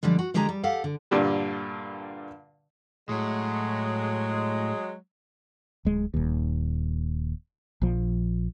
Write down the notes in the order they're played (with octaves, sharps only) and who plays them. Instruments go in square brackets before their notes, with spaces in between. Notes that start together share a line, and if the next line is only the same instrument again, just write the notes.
[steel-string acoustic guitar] D3 F3 G3 G#3
F#4
D3 G#3 G4 G#4 A#5
G3
G4 A4 F5 F#5
D3
[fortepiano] G2 A#2 D3 G3
[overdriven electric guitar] A2 [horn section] F#3 G#3
[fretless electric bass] D1 G#3
D#1 D#2
A#1 F3